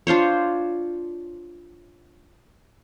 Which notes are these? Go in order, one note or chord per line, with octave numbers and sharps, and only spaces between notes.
D4 F4 C5 C#5